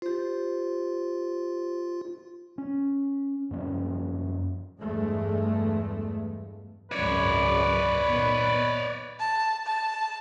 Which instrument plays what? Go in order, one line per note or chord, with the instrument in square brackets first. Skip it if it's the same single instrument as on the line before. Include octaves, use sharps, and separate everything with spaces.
[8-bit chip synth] F4 [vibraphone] G4 C5
[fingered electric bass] C#4
F#2 F3 A#3 C#4
[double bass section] E2 G2 G#3 A3
[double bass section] G#1 C#2 F#2 [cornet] B4 [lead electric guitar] C#5 D5
[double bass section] A#2 D#3 B3
[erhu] A5
A5